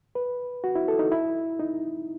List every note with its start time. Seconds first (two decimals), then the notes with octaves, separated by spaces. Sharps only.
0.15 B4
0.64 F#4
0.75 E4
0.88 A4
0.99 D#4
1.12 E4
1.60 D#4